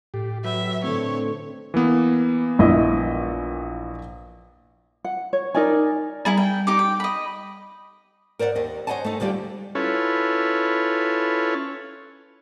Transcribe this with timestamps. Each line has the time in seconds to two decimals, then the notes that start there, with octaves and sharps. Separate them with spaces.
0.14 A2 G4
0.44 F#3 B4 E5 G5
0.84 A2 D3 A3 C4 E4 C#5
1.74 E3 A#3 B3
2.59 A#1 E4 D#5
5.04 F#5
5.33 C#5
5.55 D#4 A#4 D5 G#5
6.25 G3 E4 G#4 A#5
6.37 G5
6.67 D#4 G4 D6
6.79 G5
7.00 D#5 B5
8.39 A#4 C5 D5 E5 F#5
8.55 D#2 D#3 D#5
8.87 C5 C#5 D#5 F#5 G#5 A5
9.04 A3 D#4
9.20 D2 D3 G3 F4 G4
9.75 C#4 E4 F4 A4 B4 C#5